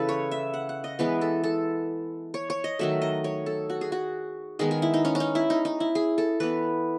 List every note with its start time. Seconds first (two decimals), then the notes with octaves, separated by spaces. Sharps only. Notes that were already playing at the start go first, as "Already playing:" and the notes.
Already playing: C#3 E3 A4 B4
0.09 C#5
0.31 E5
0.54 F#5
0.69 F#5
0.84 D#5
0.99 E3 G#3 B3 B4
1.21 A4
1.44 A4
2.34 C#5
2.50 C#5
2.64 D#5
2.79 D#3 F#3 A3 E5
3.02 D#5
3.24 C#5
3.46 A4
3.70 F#4
3.81 G#4
3.92 F#4
4.59 D#3 G#3 B3 G#4
4.71 G#4
4.82 E4
4.94 D#4
5.05 C#4
5.15 C#4
5.20 D#4
5.35 E4
5.50 D#4
5.65 D#4
5.80 E4
5.95 G#4
6.18 A4
6.40 E3 B3 B4